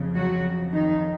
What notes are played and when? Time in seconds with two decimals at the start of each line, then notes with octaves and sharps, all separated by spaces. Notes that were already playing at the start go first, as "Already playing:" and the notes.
Already playing: F2 C#3
0.15 F#3 F#4
0.73 D#3 D#4